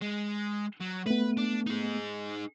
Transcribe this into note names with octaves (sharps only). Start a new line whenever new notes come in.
G#3
F#3
A3 B3 B4
D4
D#4 G#4